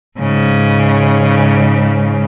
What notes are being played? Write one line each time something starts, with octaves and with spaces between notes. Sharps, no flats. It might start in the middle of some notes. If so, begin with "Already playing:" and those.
G#2 C#3